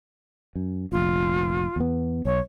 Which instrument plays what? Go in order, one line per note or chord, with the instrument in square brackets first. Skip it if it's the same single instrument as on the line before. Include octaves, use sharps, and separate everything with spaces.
[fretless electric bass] F#2
[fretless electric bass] F1 A#1 [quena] F4
[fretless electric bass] E2 B3
[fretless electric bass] B1 [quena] C#5